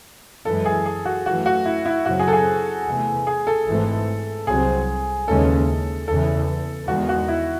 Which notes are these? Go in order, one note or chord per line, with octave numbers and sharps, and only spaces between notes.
F#2 E3 G#3 A4
G#4
G#4
F#4
F#2 E3 A3 F#4
F#4
E4
E4
F#2 C#3 F#3 C4 F#4
G#4
A4
G#4
E2 C3 E3 A3
G#4
A4
G#1 G#2 E3 A3 C4
C2 C3 F#3 C4 G#4
D#2 C#3 E3 G#3 C#4 A4
E2 C#3 E3 A4
E2 D#3 G#3 F#4
F#4
E4